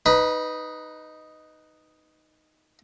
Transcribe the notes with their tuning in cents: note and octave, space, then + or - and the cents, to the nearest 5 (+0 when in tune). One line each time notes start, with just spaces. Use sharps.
D#4 +0 B4 +10 B5 -30